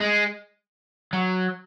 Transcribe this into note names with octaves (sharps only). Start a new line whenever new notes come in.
G#3
F#3